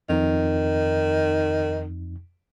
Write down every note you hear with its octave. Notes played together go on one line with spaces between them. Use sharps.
F2 D#3 D#4